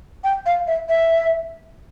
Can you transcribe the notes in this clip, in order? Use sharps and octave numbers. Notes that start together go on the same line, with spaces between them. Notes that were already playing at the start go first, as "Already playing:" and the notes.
G5
F5
E5
E5